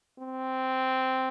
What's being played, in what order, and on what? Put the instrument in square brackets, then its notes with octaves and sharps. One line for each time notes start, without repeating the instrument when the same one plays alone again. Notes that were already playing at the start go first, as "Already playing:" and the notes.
[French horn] C4